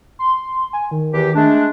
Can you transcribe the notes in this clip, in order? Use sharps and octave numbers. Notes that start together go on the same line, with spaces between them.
C6
G#5
D#3
E2 E3 G4
G#3 A3 D4